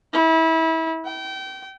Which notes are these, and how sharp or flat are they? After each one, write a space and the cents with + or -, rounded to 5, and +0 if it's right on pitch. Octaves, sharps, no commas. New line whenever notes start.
E4 -30
G5 -30